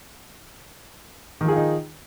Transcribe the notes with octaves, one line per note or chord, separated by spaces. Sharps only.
D#3 F3 D#4 F4 G#4